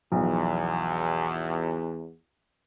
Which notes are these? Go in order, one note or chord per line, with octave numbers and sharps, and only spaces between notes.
B1 E2 F3